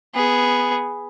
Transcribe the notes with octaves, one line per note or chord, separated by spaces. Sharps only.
B3 G#4